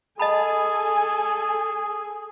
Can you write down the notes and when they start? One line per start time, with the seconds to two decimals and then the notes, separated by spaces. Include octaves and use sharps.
0.19 G#4 A4 D#5 G#5 A5 B5